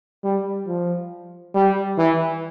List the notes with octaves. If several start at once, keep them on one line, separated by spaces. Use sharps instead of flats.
G3
F3
G3
E3